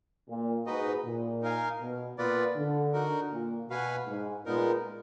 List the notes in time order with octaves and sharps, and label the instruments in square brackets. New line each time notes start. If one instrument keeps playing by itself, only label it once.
[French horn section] A#2
[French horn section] G#2 [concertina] D#4 F#4 B4 D#5
[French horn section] A#2
[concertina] D#4 A#4 F5 G#5
[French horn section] B2
[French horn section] A#2 [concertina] B3 F4 B4 D5
[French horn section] D3
[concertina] D#4 F#4 A#4
[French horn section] A#2
[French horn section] B2 [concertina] F#4 B4 F5 G#5
[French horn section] G#2
[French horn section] A#2 [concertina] G#3 B3 D#4 A#4